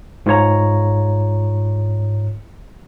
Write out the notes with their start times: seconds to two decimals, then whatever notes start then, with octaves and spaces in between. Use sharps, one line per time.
0.26 G#2 F4 C#5 A#5